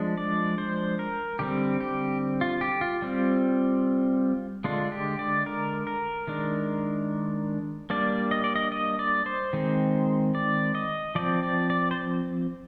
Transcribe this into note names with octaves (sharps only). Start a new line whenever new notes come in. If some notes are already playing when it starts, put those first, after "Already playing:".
Already playing: F3 G#3 D4
D5
C5
A#4
D3 G3 C4 G4
G4
F4
G4
F4
G3 C4
D3 G#3 D4 F4
G4
D5
A#4
A#4
D#3 G#3 D4
G3 A#3 D4 D5
D#5
D5
D#5
D#5
D5
C5
D#3 G#3 C4
D5
D#5
F3 C4 D5
D5
D5
C5